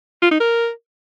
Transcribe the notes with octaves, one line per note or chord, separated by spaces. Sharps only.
F4
D#4
A#4